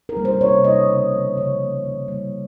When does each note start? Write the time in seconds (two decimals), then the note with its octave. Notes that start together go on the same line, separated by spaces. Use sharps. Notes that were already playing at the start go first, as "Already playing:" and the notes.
0.09 A#4
0.17 G3 A#3
0.25 C5
0.41 C3 C#5
0.65 G3 A#3 D#5
0.89 C#3
1.13 F3 A#3
1.37 C#3 C#5
1.61 F3 A#3
1.84 D#3
2.08 G3 A#3